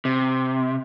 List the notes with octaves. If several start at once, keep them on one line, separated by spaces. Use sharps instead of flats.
C3